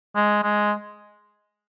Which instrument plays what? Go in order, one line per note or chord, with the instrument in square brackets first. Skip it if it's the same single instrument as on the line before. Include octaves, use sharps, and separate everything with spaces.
[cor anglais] G#3
G#3